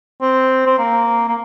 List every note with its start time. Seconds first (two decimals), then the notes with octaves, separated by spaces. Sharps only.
0.22 C4
0.66 C4
0.78 A#3
1.28 A#3